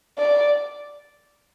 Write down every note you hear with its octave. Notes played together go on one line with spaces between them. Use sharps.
D5